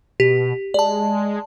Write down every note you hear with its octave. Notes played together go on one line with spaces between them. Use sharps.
B2 G4
G#3 D5 A5